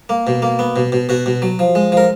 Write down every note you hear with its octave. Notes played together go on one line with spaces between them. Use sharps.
A#3
B2
A#3
B3
B2
B2
B2 F#4
B2
F#3
F3
G#3
F3 A#4